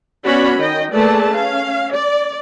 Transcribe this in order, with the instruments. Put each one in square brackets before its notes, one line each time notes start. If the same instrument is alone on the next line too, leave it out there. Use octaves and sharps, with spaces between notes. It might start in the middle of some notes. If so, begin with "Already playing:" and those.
[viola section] B3 C#4 F#4 C#5 D5 B5
D#3 D#5 G5
A3 A#3 G#4 B4 D5 A5
C#4 F5
D5